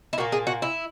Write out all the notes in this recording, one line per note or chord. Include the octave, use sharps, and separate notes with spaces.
E4
A#2 A#3 F#4
G#4
F#4
E4